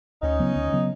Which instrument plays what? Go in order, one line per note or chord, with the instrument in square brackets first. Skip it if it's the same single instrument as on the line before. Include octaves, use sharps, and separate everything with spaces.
[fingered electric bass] D2 [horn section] C#4 D#4
[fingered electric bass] C#3 F#3 B3
D2
C#3 F#3 B3